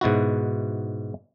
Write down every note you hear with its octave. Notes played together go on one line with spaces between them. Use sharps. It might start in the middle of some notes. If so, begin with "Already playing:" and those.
G#2 B2 E4 F#4